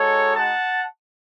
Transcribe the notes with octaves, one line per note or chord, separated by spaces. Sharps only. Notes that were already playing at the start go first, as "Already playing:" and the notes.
Already playing: G#3 D#4 F#4 A4 C#5
F#5 A5